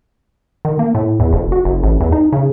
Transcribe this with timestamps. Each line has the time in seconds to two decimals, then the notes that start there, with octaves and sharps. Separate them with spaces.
0.65 D#3
0.79 A#3
0.95 A2
1.20 E2
1.33 F1
1.52 F#4
1.65 F#1
1.83 A1
2.00 E2
2.12 D#4
2.33 C#3